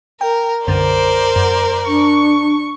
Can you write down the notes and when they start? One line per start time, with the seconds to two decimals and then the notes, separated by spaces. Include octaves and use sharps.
0.21 A#4 G5
0.67 B1 F#2 D3 A#4 C5 D5
1.36 F#2
1.87 D4 C#6